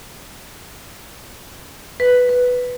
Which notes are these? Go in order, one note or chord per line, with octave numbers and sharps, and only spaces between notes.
B4
B4